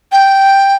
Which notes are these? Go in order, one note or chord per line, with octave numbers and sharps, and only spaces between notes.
G5